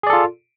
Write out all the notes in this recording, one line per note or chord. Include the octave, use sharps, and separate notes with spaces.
F4 G#4 A4 D5